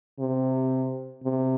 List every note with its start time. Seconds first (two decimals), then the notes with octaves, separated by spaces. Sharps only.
0.20 C3
1.24 C3